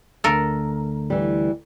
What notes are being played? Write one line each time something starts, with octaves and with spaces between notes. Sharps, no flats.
D2 D3 A3 A4 A#4
E3 G3